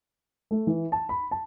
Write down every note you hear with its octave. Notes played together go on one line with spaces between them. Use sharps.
A3
E3
A5
B5
A5